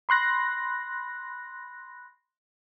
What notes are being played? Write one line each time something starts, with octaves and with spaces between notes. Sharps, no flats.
B5 C6 F#6 A#6